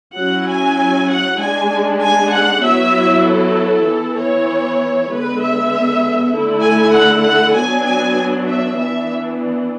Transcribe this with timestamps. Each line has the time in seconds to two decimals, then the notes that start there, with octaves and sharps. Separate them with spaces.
0.16 F#3 C#4 E4 F#5
0.47 G#5
1.09 F#5
1.39 G#3 D4 G#5
2.01 G#5
2.32 F#5
2.62 F#3 B3 E4 E5
3.24 A4
3.85 E3 B3 E4
4.17 C#5
5.08 D3 G#3 B3 B4
5.40 E5
6.32 D3 A3 E4
6.63 G#5
6.94 F#5
7.24 F#5
7.55 F#3 B3 D4 G#5
7.86 G#5
8.48 E5
8.78 E3 B3 D4 E5